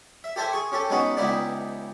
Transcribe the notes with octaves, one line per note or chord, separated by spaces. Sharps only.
E5
G4 A4 C5 E5 G#5
G#4 C#6
C#4 G4 A4
G#3 B3 C#4 D#4 F#4
C#2 B3 D#4 E4 G4 D5